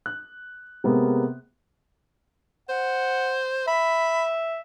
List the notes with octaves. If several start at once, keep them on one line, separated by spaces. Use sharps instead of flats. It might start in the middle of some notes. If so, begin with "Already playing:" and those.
F#6
C3 G#3 A#3 B3
C5 F#5
E5 B5